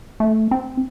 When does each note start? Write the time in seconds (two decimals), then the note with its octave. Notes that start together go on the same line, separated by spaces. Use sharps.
0.20 A3
0.51 C4